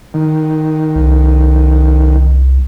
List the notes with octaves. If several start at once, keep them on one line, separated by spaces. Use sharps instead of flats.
D#3
C2